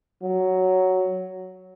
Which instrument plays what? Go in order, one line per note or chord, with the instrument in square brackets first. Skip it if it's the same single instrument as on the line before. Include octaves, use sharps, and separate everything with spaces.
[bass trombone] F#3